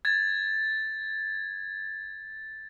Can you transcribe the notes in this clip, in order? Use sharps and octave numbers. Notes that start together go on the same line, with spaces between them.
G#6 A6